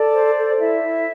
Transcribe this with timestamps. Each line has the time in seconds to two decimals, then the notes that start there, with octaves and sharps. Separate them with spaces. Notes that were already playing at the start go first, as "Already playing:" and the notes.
Already playing: A4 D5
0.14 C5
0.37 A4
0.59 E4 E5
0.82 E4